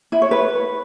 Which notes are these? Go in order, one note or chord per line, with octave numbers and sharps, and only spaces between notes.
E4
C#5
B4